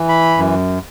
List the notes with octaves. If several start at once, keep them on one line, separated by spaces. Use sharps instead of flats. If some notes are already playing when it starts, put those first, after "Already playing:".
Already playing: E3
B5
F#2